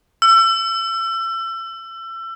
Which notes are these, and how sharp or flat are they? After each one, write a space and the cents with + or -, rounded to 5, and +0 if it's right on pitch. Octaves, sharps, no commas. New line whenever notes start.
E6 +30